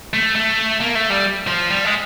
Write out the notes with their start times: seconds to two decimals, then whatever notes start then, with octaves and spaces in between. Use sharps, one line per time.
0.13 A3
0.35 A3
0.80 A#3
0.95 A3
1.10 G3
1.47 F3
1.70 G3
1.85 G#3